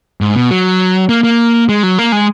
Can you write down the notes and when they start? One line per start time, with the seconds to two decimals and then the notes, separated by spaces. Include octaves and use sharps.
0.21 G#2
0.36 B2
0.51 F#3
1.09 A#3
1.24 A#3
1.69 G#3
1.83 F#3
1.98 A#3
2.12 G#3